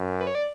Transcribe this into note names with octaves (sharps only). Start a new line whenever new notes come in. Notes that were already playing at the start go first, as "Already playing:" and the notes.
Already playing: F#2
B4
C#5
D5